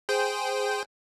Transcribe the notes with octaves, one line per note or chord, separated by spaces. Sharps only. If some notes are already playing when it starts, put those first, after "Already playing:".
G#4 C5 G5